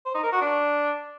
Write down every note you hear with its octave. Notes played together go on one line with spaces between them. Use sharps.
C5
D#4
A#4
F#4
D4